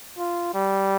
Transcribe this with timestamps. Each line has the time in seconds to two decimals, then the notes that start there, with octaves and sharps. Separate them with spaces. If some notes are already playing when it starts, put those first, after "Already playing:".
0.18 F4
0.54 G3